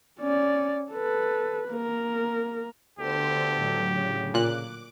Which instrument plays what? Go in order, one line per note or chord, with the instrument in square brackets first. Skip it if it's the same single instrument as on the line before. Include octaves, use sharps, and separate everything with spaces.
[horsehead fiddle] C#4 D5
A4 B4
A#3 A#4
[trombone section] D2 B3 A4 [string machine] D3 C5 C6 [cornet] G4
[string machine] A2 D3 F#3
[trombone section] C#3
[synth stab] A#2 F#6 [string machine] D6